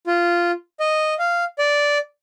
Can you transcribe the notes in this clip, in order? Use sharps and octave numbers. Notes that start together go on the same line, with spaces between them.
F4
D#5
F5
D5